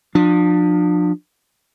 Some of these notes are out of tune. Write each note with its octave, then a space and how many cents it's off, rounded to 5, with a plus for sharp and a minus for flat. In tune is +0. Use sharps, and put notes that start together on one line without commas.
F3 +25 D4 +30